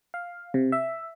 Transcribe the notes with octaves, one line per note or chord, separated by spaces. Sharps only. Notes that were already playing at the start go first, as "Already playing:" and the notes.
F5
C3
E5